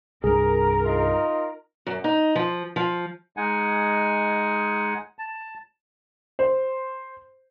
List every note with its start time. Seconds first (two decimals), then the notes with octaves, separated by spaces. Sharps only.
0.24 C2 G2 G#4 A#4
0.85 D#4 F4 D#5
1.87 F#2
2.04 D#4
2.35 F3
2.76 F3
3.37 G#3 D#4 F#5 G#5
5.19 A5
6.39 C5